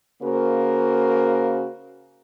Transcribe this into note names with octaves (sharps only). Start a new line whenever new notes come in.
C#3 A#3 F#4 A#4 C5